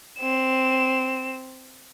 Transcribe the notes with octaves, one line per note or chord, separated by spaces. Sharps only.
C4 E7